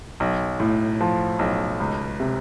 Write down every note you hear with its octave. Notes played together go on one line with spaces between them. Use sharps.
B1
A2
F3
B1
C#2
C3